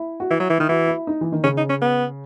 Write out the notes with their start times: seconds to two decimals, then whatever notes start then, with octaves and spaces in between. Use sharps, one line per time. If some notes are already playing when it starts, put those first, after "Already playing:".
Already playing: E4
0.20 F#4
0.31 E3 E4
0.40 F#3
0.50 E3
0.58 D#3 E4
0.69 E3 F#4
0.88 E4
1.07 D#4
1.21 E3
1.32 D#3
1.44 C#3 C#4
1.57 D#4
1.70 C#4
1.82 B3